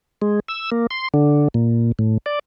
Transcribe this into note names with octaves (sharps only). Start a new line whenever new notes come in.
G#3
E6
A#3
C6
D3
A#2
A2
D5